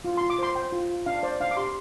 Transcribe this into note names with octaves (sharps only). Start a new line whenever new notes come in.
F4
F4 C6
D6
C5 C6
C5 G5
F4
F4
D4 F5
C5 D5
D4 F5
D6
G4 C6